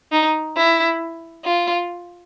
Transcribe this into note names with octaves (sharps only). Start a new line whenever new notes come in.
D#4
E4
F4